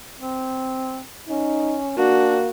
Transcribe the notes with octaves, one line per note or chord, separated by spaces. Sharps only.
C4
C#4 D#4
A#3 D4 F#4